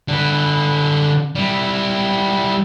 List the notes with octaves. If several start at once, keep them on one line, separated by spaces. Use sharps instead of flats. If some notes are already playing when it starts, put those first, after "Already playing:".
D3 B4
G3 E4